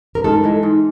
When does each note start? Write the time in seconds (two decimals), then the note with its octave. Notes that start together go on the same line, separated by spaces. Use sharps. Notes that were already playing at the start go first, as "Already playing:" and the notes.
0.15 A#4
0.24 G#2 A4
0.44 E3 G#3
0.63 G#2